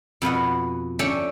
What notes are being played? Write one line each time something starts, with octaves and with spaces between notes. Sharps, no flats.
F2 B2 B4 F#5
C#4 D4 A4 E5 G5